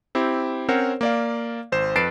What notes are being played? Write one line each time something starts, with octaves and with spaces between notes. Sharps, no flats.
C4 E4 G4
C4 C#4 A#4 C5 C#5 F#5
A#3 D5 F5
G#1 C5 E7
F2 B4 A6 C7 D7 E7